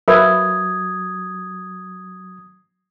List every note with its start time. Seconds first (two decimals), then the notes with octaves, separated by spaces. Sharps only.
0.08 F#3 A#4 B4 E5 D#6 G#6